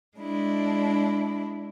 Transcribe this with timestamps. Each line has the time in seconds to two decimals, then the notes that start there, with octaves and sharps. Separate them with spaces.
0.18 G#3 D4 E4